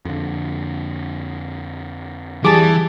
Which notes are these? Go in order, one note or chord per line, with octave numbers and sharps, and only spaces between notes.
F2 D3
E3 G3 G#4 A5 D6